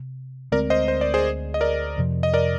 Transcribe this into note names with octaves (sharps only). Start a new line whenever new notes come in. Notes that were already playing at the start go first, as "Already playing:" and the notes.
Already playing: C3
D2 D3 G#3 C4 A#4 D5
C5 D#5
C5
D5
G#4 C5
D#5
A#4 D5
F2 C3 F3
D#5
A#4 D5